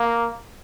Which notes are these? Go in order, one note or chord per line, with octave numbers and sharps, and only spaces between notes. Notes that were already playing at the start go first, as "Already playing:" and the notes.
Already playing: A#3